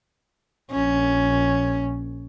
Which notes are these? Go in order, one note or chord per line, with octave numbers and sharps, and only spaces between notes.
A#1 C#4